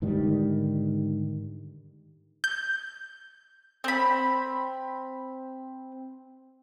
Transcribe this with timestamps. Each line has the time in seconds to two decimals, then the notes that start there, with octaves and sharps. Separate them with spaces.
0.02 G#2 D3 D#3 G3
2.44 G6
3.84 C4 B5